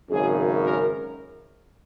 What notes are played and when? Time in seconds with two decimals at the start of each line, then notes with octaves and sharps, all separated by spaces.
0.10 G#1 F#2 C#3 G#4
0.63 A#4